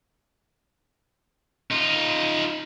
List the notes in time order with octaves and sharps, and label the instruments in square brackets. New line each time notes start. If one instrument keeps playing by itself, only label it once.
[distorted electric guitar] D#4 F4